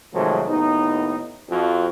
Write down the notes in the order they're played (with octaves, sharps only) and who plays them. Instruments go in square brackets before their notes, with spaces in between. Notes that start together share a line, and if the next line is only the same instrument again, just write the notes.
[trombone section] G#2 C3 D#3 F3 F#3 A3
D#2 A2 B3 D#4
F2 F3 F#4